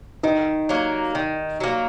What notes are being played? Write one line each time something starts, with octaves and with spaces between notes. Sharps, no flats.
D#3 D#4
F#3 A#3
D#3
F#3 A#3